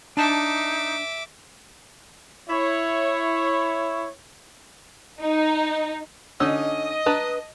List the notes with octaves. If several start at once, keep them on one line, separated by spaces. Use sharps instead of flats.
D4 D#4 E5 A5 D6
E4 C#5
D#4
D3 C#4 D#4 D#5 E6
D4 B4 A5 A#5